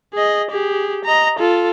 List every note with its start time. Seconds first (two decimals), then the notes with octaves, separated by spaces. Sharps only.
0.13 G#4 D#5
0.50 G4 G#4
1.05 D#5 A#5
1.39 F4 A4